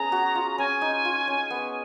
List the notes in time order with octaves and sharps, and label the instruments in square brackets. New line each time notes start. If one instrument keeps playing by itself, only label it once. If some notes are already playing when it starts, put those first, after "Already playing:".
Already playing: [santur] B3 C#4 G#4 [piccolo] A#5
[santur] F#4
F4
[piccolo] A#5
[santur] C#4 [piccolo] G#5
[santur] D#4
F4
C#4
B3